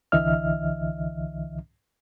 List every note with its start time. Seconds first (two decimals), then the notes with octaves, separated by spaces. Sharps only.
0.12 C2 D3 E3 D#5 E5 F6